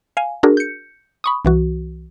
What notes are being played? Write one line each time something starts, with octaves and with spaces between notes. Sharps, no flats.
F5 G#5
D4 F#4 G#4 A#4
G6 C#7
B5 C#6 D#6
C2 E3 F#4